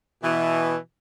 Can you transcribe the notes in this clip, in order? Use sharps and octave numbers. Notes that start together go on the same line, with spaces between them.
B2 E3